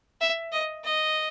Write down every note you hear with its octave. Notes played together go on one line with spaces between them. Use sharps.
E5
D#5
D#5